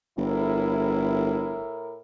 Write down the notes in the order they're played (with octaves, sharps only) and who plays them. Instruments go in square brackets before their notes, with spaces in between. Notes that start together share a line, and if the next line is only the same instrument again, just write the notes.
[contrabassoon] G1 [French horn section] A2 E4 A#4